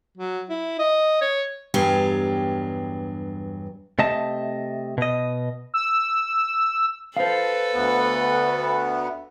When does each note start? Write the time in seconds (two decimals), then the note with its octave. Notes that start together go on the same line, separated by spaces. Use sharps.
0.18 F#3
0.50 E4
0.79 D#5
1.22 C#5
1.74 E2 G2 F#3 D4 G4 F5
3.99 C3 A3 D#5 E5 A5
4.98 B2 D#5
5.74 E6
7.17 A4 B4 C5 F5
7.74 D2 B3